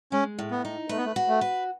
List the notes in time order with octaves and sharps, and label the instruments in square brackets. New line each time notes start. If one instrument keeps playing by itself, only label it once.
[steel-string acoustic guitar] G#3 [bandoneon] C#4
[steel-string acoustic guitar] A2
[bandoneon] B3
[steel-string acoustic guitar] D#4
[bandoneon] A3 [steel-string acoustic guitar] B4
[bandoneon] B3
A3
[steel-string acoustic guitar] F#4
[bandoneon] A3
[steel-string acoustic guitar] B4